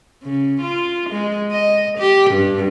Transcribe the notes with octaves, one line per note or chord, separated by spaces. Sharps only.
C#3
F4
G#3
D#5
G4
G2